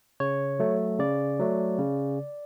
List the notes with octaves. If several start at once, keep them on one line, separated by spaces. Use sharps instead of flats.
C#3 C#5
F#3 A3
C#3 D5
F#3 A3
C#3